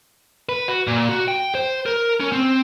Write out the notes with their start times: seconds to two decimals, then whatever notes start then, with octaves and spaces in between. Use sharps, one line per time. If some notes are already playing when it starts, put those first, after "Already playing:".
0.49 B4
0.68 F#4
0.87 A#2
1.09 F#4
1.28 G5
1.55 C5
1.86 A#4
2.20 C#4
2.32 C4